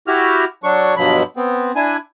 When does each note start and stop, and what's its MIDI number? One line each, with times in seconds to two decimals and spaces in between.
0.08 0.45 64
0.08 0.45 66
0.08 0.45 67
0.08 0.45 89
0.64 0.95 54
0.64 0.95 62
0.64 0.95 85
0.97 1.23 43
0.97 1.23 47
0.97 1.23 53
0.97 1.23 54
0.97 1.23 83
1.37 1.72 59
1.37 1.72 60
1.76 1.97 62
1.76 1.97 64
1.76 1.97 80